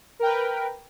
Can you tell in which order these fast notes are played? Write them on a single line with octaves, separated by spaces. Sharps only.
A#4 G5 B4